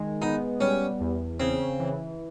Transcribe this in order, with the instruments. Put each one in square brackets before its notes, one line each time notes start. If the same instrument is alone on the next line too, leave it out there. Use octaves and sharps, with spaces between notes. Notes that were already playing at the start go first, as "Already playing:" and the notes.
Already playing: [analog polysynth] D#3 G#3
[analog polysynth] B3 [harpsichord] D#4
[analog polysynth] G3 [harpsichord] C#4
[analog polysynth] E2
[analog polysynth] C#3 [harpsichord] C4
[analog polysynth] E3